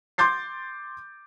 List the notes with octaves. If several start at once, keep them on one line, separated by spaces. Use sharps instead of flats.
C6 D6 G6 A6 C7